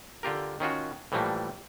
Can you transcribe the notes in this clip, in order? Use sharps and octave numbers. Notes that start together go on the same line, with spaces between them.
D3 F4 G4 A#4
D#3 C#4 F4 F#4
A2 E3 F3 G3 A3 A#3